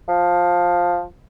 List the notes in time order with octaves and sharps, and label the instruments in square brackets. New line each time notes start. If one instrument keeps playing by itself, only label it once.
[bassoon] F3